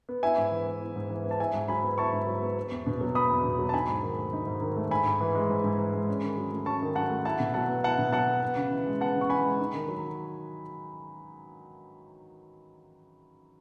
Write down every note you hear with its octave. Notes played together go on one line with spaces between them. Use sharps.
B3
E4 E5 G#5
G#2
E3
B3
E4
G#2
E3
B3
A5
E4 E5 G#5
G#2
F#3 G#5 B5
B3
E4 A5 C#6
G#2
F#3
B3
B3
E2
B2
F#3
B3 B5 D#6
E2
B2
F#3
A5
D#4 G#5 B5
G#2
D#3
A3
D#4
G#2
D#3
A3
G#2 G#5 B5
G#2
E3
G#3
G#2
G#2
E3
G#3
C#4
D#3
F#3
A3
C#4 A5 C#6
D#3
F#3 F#5 A5
A3
E4 F#5 A5
B2
F#3 F#5 A5
B3
E4 F#5 A5
B2
F#3 F#5 A5
B3
B3
C#3
E3
G#3
B3 F#5 A5
C#3
C#6
E3 G#5 B5
G#3
D#4
D#3
F#3